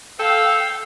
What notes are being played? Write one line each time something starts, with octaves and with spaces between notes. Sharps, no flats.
A4 F5 G5 E6